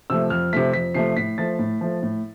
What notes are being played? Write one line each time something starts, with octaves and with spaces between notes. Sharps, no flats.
C3 F3 A3 E6
F2 F6
C3 F3 A3 B6
F2 B6
C3 F3 A3 C7
A2 B6
F3 A3 A6
A2
F3 A3
A2